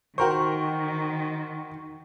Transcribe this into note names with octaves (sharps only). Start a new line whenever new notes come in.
D#3 F#4 A#4 C5 G5 C#6